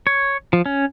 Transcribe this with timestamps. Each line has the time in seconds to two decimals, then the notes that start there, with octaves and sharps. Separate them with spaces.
0.07 C#5
0.53 F3
0.66 C#4